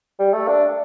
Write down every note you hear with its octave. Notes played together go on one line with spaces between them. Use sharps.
G3
A3
D4